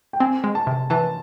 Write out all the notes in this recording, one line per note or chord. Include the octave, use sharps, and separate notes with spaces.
G5
C4 G#5
G#3
A5
C3
E3 A5